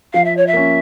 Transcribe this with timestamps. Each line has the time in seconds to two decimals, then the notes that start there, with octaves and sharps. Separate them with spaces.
0.13 F3 F5
0.24 E5
0.37 C#5
0.47 E5
0.53 A#3 C#4